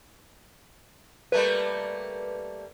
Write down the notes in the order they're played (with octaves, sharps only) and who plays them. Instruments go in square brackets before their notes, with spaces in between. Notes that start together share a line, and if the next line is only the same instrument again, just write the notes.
[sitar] G3 A3 A#3 [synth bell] B4